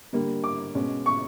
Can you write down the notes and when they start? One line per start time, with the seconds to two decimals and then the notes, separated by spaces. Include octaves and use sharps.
0.13 D3 G3 A#3
0.44 D6
0.75 B2 G#3 C#4
1.06 C#6